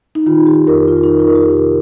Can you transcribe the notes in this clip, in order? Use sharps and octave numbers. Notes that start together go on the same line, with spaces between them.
D#4
D#3 F4
D#3 G4
F2 A#4
F2 F4
D#4
D#3
F4
A#4
D#3
G4
C3 A#4